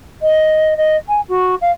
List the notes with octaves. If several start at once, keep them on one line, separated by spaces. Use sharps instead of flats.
D#5
D#5
G#5
F#4
F5